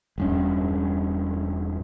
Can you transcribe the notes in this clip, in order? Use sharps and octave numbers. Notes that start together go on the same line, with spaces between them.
E1 G2 C#4